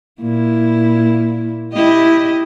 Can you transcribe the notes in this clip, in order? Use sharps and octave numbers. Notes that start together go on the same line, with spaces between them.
A#2 A#3 E4
E4 G4 D#5